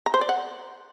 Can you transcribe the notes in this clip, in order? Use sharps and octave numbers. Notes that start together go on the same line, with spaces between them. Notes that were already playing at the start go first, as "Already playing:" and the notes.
A#5
C5
D5
F#5